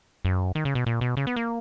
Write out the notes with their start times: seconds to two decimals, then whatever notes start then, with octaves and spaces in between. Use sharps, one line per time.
0.25 F#2
0.55 D#3
0.65 C#3
0.75 B2
0.86 A#2
1.01 B2
1.17 C#3
1.27 B3
1.36 A#3